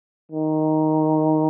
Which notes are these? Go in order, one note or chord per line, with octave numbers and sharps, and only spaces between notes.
D#3